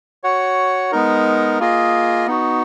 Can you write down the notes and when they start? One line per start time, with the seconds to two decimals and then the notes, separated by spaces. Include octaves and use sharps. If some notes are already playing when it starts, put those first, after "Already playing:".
0.24 F#4 C#5 F#5
0.92 G#3 B3 D#4 A#4
1.60 A#3 F4 G#4 D#5
2.26 B3 D#4 F#4